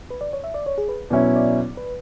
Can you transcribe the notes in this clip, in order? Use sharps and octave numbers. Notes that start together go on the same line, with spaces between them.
B4
D5
C#5
E5
D5
C#5
G#4
B4
B2 F#3 C#4 E4 D5
E5
D5
B4